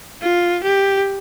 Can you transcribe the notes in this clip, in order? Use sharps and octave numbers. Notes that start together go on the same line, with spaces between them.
F4
G4